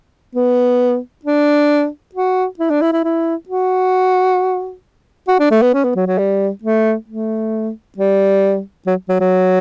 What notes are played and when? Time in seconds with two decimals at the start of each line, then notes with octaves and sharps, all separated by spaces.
0.35 B3
1.25 D4
2.15 F#4
2.59 E4
2.70 D4
2.81 E4
2.92 E4
3.04 E4
3.48 F#4
5.28 F#4
5.40 D4
5.51 A3
5.62 B3
5.74 C#4
5.84 B3
5.96 F#3
6.07 F#3
6.18 G3
6.63 A3
7.08 A3
7.98 G3
8.87 F#3
9.09 F#3
9.20 F#3